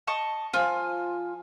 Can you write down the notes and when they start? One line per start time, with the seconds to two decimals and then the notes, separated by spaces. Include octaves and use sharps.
0.07 D#5 A5 C#6
0.53 F3 F4 G#5